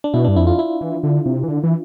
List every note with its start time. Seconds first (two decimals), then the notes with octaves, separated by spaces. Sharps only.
0.04 D4
0.14 B2 E4
0.24 G2 D4
0.36 F2 E4
0.47 F4
0.59 E4
0.81 E3
1.04 D3
1.26 C3
1.44 E3
1.48 D3
1.64 E3